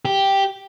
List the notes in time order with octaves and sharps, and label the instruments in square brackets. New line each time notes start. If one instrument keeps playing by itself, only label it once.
[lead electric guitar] G4